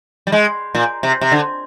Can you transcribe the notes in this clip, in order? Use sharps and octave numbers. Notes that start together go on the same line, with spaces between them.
G3
G#3
A#2
C3
C3
D3